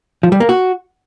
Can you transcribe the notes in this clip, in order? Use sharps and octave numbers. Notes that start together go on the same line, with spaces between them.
F3
G3
A#3
F#4